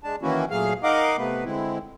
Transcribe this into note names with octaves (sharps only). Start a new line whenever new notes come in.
G#3 D4 A5
D#3 E3 A#3 C#4 E4 F#4
A#2 F#3 A3 G#4 F5 F6
D#4 A#4 D#5 F5 F#5 D6
C3 A3 B3 B4
D3 G#3 C4 E4